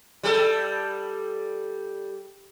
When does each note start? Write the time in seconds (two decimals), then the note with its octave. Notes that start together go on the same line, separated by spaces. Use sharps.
0.23 G3 A4